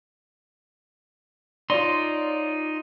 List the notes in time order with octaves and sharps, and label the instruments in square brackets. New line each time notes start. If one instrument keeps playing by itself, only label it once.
[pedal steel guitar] D#4 C6 [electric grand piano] F4 C#5 D5